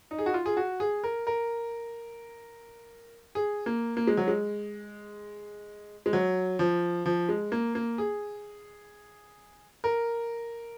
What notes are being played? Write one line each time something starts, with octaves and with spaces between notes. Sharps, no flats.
D#4
G#4
F#4
F4
G#4
F#4
G#4
A#4
A#4
G#4
A#3
A#3
G#3
F#3
G#3
G#3
F#3
F3
F3
G#3
A#3
A#3
G#4
A#4